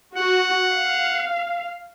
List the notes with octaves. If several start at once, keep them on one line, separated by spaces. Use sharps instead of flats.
F#4 F#5
F5